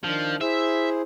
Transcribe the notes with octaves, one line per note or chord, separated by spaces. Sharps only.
D#3 F3 D4
E4 G#4 C5 E5